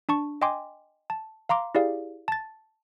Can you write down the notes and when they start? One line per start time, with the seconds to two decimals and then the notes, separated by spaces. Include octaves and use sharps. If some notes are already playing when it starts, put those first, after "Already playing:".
0.09 D4 A5 C#6
0.42 D#5 G5 G#5 C6 D6
1.10 A5
1.49 F5 A#5 C6 D6
1.75 E4 G4 G#4 D5 F5
2.28 A5 A6